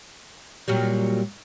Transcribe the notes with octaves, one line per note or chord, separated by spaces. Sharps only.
A#2 F#3 G3